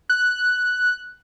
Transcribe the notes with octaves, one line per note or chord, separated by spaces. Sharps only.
F#6